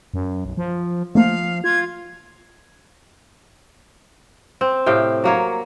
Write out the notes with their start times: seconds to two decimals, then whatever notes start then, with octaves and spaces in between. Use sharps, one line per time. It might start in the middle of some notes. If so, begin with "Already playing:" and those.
0.14 F#2
0.45 B1
0.57 F3
1.15 F3 A3 A#3 F5
1.64 F4 G#6
4.61 C4
4.86 A2 C3 F5 G5
5.24 F#3 A#3 C#5